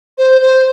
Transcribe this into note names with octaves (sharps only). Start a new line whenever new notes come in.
C5
C5